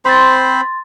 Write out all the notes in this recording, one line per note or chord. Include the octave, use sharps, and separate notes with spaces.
C4 C5 B5 C6 A6